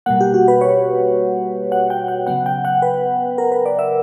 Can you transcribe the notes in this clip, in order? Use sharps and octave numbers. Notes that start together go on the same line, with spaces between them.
B2 G3 A#3 F#5
G4
F#4
B4
C#5
F#5
G5
F#5
C#3 F#3 B3 F#5
G5
F#5
B4
A#4
B4
D5
E5